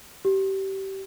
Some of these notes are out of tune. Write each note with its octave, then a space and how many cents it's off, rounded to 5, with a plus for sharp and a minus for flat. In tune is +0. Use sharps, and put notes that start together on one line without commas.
G4 -25